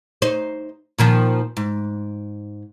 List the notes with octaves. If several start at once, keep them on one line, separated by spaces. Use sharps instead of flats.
D#4 C5
A#2 D#3 F3
G#2